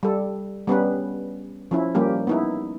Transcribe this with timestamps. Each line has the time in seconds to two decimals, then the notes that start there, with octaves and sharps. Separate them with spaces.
0.03 G3 A4
0.67 G3 B3 C#4 B4
1.71 F3 C#4 E4
1.95 F3 G3 A#3 C#4 G4
2.27 B3 D#4 E4